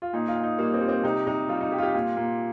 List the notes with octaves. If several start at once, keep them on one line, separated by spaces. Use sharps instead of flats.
F4
A#2 D#4
F4
A#2
D#4
G3 A#3
C4
G3
C4
C3 D#4
C3 D#4
G3 F4
D#4
G3 G4
F4
G4
A#2 F4
A#2